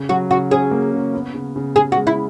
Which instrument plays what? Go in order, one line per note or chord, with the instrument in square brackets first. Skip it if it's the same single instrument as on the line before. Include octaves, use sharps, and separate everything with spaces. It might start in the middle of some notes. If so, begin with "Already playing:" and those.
Already playing: [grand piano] C#3
[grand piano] F#3 [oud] F#4
[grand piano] C#3 [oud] F#4
[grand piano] C#4 [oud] G#4
[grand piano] A#3
C#3
B3
C#3
C#3
[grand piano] C#3 [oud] G#4
[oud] F#4
[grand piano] G#3
[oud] E4